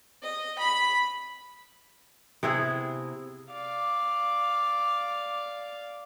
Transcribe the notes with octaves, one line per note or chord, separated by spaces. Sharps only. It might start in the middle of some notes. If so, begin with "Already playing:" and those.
D#5
B5
C3 B3 E4 G#4
D5 F5